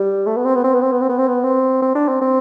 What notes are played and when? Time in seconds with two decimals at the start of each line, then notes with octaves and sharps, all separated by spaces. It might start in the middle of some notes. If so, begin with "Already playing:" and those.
Already playing: G3
0.27 A3
0.37 B3
0.45 C4
0.55 B3
0.64 C4
0.74 B3
0.82 C4
0.92 B3
1.01 C4
1.10 B3
1.18 C4
1.28 B3
1.44 C4
1.82 C4
1.95 D4
2.08 C4
2.22 C4